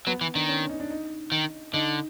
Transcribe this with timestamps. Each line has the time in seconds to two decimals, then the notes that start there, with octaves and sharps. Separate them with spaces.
0.07 F#3 B3
0.21 E3
0.35 D#3 D4
0.49 C#4
0.69 D#4
0.80 D4
0.90 D#4
1.32 D#3
1.73 D3 D#4